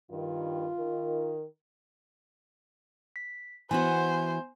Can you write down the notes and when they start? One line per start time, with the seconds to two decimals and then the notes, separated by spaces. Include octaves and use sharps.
0.11 G2 D#3 F4
0.77 D#3 A#4
3.16 B6
3.71 E3 B3 F#4 C5 G#5